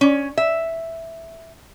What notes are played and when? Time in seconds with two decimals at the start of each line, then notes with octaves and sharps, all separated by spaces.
0.01 C#4
0.38 E5